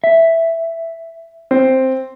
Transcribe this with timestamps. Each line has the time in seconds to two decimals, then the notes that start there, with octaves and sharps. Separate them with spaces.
0.04 E5
1.51 C4